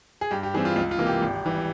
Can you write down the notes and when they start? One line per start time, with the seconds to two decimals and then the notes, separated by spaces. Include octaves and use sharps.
0.21 G#4
0.31 G2 G4
0.43 G4
0.54 E3 G3 C4 G#4
0.65 F4
0.76 C#2 F4
0.91 F4
0.99 C3 E3 A#3
1.07 G4
1.22 G#1
1.45 E3 G3